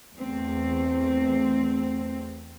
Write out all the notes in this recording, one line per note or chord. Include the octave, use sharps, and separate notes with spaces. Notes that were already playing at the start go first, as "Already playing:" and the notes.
E2 A3 C4